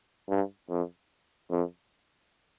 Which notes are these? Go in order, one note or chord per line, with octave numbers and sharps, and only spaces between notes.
G2
F2
F2